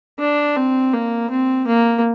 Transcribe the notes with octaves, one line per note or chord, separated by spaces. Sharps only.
D4
C4
A#3
C4
A#3